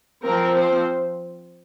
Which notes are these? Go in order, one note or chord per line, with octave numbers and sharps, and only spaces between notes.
F3 C4 A#4
C5